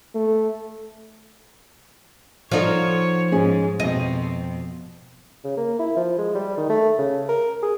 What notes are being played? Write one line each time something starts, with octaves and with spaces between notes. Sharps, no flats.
A3
F3 D#4 A4 C#5 D5 F#5
G#2 C#4 G#4 C#5
F2 B2 C4 D#5
C#3
A#3
E4
F3
G#3
G3
D#3
A3
C#3
A#4
G#4